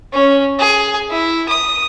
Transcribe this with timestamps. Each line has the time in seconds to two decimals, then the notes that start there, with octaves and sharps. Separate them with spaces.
0.13 C#4
0.59 G#4
1.10 E4
1.49 D#6